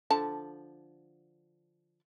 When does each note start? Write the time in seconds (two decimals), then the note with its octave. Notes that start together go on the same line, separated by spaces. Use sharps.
0.10 D3 F3 A5